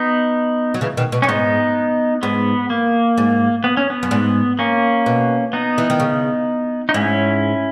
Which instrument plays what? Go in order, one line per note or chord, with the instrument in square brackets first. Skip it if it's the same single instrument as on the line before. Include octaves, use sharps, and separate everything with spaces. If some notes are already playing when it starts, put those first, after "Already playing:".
Already playing: [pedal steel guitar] B3 D#4
[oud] F#3
C#3 E3
B2 D#3
B2
[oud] F#2 [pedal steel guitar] C#4
[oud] G#2 [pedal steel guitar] B3 D#4
[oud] G#2 [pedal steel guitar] B3
[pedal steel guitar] A#3
[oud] G#2
[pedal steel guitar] B3
C#4
B3
[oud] F#2
G#2
[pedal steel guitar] A#3 C#4
[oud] B2
[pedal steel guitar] B3 D#4
[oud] E3
D#3
C#3
[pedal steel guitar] D#4
[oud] G#2 [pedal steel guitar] C#4 E4